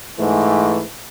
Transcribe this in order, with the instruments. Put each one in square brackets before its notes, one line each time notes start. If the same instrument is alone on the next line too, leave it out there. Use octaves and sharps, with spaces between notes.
[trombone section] G#2 E3 A3